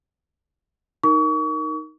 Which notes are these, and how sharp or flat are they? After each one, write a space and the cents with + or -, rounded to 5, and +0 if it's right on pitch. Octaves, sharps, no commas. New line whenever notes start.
D#4 +0 A#4 +0 C#6 +35